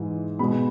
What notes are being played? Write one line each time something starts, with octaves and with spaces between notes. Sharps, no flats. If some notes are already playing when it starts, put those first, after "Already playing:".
Already playing: G#2 E3 G#3
B2 G#3 B3 B5